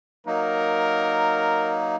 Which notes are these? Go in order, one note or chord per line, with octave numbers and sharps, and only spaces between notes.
F#3 A#3 D#4 A#4